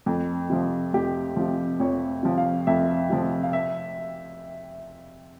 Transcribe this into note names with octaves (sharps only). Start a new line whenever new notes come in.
F2
C3 F3
F2 G4
C3 F3
F2 C#5
C3 F3
F5
F2 E5
C3 F3
F5
E5